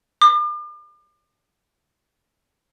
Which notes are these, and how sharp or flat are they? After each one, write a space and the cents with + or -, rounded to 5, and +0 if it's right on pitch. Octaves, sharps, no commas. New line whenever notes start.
D6 +40